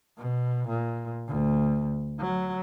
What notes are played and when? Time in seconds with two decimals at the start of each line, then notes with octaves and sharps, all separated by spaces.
0.18 B2
0.68 A#2
1.28 D2
2.20 F#3